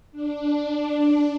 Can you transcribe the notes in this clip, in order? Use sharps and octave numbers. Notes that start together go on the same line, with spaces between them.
D4